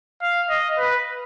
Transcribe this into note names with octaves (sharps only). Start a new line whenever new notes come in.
F5
D#5
B4